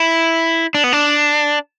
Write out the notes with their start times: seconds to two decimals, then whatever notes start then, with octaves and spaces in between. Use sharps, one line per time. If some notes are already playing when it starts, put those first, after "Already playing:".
Already playing: E4
0.74 D4
0.84 B3
0.93 D4